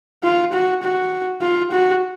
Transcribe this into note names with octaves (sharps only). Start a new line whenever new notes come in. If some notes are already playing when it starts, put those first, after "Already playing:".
F4
F#4
F#4
F4
F#4